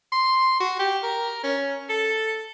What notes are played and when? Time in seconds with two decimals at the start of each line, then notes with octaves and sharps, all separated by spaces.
0.12 C6
0.60 F#4
0.79 G4
1.03 A#4
1.43 C#4
1.89 A4